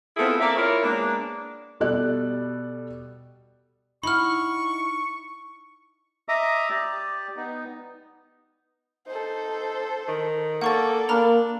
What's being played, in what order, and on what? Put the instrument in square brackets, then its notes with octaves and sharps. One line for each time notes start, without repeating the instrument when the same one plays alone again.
[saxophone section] B3 C4 E4 F4 G#4 A4
A#3 D5 E5
C4 E4 F4 A#4 C#5
G#3 A#3 B3 D4
[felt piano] B2 G3 A4 D5 F#6
[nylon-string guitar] D#4 E4 F#5 [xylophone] B5 F6 [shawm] C#6
[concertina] D#5 E5 A#5 D6 D#6
G4 D5
B3 D#4
[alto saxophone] D#4 [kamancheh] A4 C5
[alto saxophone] D#3
[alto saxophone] A#3 [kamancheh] A4 D5 [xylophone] F#5 C#6 A6
[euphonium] A#3 [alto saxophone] D4 [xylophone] A#5 B5 F6